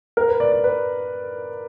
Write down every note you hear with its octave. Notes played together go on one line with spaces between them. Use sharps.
A#4
B4
D5
D5
B4